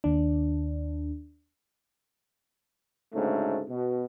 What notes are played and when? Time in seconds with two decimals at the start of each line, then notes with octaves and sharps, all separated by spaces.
0.04 D#2 D4
3.13 D2 G#2 C#3 A3
3.69 B2